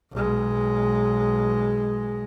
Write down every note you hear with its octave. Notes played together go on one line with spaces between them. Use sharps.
B1 G#3